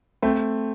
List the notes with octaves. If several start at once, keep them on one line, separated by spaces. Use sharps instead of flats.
A3 C4